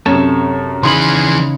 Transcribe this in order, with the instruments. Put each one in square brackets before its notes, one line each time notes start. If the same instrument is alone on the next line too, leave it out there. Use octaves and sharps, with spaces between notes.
[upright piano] F#2 C3 [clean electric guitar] A4 C#5 A5
[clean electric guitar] C#3 D#4 B5 [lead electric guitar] E3 G#4 [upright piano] C6